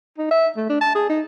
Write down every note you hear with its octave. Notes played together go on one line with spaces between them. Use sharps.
D#4
E5
A3
D4
A5
G#4
D#4